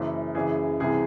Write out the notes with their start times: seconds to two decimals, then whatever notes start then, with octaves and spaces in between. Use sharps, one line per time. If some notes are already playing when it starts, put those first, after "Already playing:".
Already playing: F#1 F#2 E3
0.35 F#1 F#2 C#3 E3 G#4
0.80 C2 C3 E3 G#4